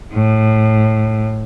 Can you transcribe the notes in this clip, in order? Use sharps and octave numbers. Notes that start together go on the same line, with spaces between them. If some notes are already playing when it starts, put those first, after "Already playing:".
A2